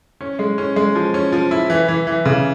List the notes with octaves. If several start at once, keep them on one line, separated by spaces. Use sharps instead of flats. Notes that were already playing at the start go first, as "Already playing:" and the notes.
C#4
G#3
C#4
G#3
F3
C#4
F3
E4
E3
E3
E3
C#3